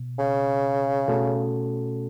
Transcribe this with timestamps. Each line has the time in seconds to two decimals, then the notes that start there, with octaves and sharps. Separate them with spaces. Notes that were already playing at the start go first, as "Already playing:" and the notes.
Already playing: B2
0.19 C#3
1.08 B2 A3 C#4 F#4 A4